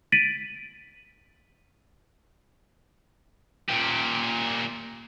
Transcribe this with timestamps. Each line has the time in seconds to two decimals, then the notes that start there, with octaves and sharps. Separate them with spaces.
0.12 A6 B6 D7 D#7 F#7
3.69 A#2 G4